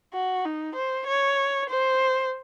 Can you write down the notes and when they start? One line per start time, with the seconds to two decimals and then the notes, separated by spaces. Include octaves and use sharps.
0.14 F#4
0.45 D#4
0.75 C5
1.07 C#5
1.69 C5